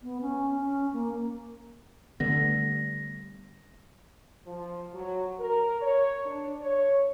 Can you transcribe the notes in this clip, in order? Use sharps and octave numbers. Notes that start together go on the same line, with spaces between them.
B3
C#4
C#4
A#3
D3 G3 A3 B3 A#6
F3
F#3
A#4
C#5
D4
C#5